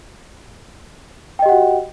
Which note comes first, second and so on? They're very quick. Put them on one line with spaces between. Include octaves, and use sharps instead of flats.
G5 D#5 G4 F#5 F#4